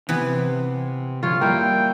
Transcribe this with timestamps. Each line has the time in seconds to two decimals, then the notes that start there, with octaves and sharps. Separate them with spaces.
0.09 C3 E3 B3
1.23 G#1 D3 F3 F4 C#5
1.41 G3 A#3 E4 G5